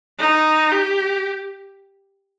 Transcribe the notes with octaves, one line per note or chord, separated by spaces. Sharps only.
D#4
G4